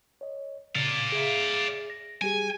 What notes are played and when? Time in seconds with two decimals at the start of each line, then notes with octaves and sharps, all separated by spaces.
0.21 C#5 D#5
0.76 A#2 C#3 D5 F5
1.12 G#4 E5
1.90 A#6
2.22 G3 G4 G#4 G#5